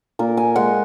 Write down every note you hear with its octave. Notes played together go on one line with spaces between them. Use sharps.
A#2 A#4
G#5
G#3 F#5